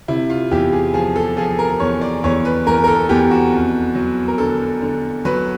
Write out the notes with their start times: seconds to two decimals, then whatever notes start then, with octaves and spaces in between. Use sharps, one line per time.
0.08 C3 E4
0.30 F4
0.51 E2 G4
0.73 G#4
0.94 F3 G#4
1.16 A4
1.37 F3 G#4
1.59 A#4
1.80 E2 C#5
2.01 D5
2.24 E2 C#5
2.45 B4
2.67 E2 A#4
2.84 A#4
2.88 A4
3.09 E2 G4
3.31 F#4
3.53 F2
3.95 F#3
4.28 A#4
4.38 D3 A4
4.82 D3
5.25 F#3 B4